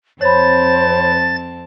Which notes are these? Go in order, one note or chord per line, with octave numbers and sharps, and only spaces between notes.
F2 C4 C5 C#5 A5 B5 A6